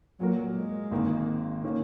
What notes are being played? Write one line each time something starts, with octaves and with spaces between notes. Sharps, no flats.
A#2 F#3 A#3 F#4 A#4
G#3
G#1 G#2 D#3 A#3
D#3 A#3 C#4